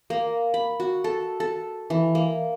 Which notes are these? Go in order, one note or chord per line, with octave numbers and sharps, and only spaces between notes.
A#3
B5
F#4
A4
A4
E3
A#3